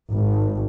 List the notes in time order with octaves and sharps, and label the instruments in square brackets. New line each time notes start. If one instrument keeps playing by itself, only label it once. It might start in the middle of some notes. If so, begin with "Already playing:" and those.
[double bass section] G#1